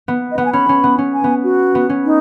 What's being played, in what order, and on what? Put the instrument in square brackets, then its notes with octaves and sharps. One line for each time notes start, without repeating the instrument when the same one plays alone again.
[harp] B3
[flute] D#5
[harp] B3 [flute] F#5
[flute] G#5
[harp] C#4 [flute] B5
[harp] C#4
B3
C#4
[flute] G#5
[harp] B3
[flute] F#4
[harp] B3
C#4
[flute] D#4